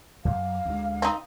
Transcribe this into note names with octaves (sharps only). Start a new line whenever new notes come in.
F#2 F5
D2 G#3
C4 D#4